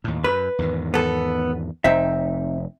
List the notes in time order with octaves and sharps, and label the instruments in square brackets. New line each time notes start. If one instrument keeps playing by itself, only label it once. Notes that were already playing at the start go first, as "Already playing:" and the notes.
[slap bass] D#2 A2
[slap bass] F#2 [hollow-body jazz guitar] B4
[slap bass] E2 G#2 D#3
[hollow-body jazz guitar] B3 A4
[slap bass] F1 [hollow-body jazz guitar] C4 D#4 E5